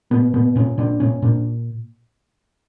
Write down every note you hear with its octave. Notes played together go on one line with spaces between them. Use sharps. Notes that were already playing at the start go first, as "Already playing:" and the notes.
A#2 B3
A#2 B3
A#2 C#4
A#2 D4
A#2 C#4
A#2 D4